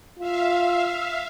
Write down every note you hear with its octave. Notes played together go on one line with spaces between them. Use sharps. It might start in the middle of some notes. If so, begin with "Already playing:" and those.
F4 E5 F5